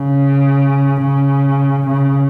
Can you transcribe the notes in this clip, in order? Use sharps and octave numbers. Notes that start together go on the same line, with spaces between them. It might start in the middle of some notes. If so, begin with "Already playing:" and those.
Already playing: C#3
C#3
C#3